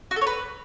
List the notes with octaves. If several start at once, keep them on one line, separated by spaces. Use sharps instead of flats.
F#4
A4
C#5
B4